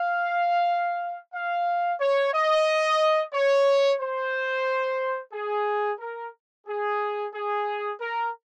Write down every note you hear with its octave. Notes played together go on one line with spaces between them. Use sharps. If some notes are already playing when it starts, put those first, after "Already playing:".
Already playing: F5
F5
C#5
D#5
C#5
C5
G#4
A#4
G#4
G#4
A#4